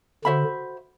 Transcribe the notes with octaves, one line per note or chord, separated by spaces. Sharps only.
D3 F#4 C5 E5 B5